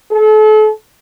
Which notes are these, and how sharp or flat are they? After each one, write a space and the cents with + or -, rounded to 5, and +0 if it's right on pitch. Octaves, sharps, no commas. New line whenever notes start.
A4 -35